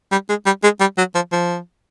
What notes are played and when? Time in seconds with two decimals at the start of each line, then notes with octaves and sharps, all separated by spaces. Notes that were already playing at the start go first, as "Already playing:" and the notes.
0.12 G3
0.29 G#3
0.46 G3
0.63 G#3
0.80 G3
0.98 F#3
1.15 F3
1.32 F3